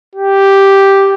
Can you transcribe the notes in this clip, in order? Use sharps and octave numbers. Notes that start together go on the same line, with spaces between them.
G4